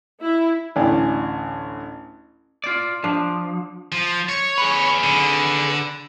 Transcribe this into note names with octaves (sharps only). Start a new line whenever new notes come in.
E4
A1 D2 D5 G#5
F4 D5
F3 D4
F3
C#5
G#4 B4
D3